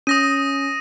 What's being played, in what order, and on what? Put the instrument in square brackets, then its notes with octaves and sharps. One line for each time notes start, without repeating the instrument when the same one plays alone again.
[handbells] C#4 [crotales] D#6 A#6 D#7